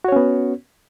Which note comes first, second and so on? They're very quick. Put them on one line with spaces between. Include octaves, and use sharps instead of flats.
F#4 C#5 C#4 B3